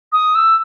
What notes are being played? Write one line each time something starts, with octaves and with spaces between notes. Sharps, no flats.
D#6
E6